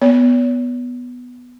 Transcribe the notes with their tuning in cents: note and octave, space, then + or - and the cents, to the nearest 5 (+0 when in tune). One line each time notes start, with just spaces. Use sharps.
B3 +0 C#5 +40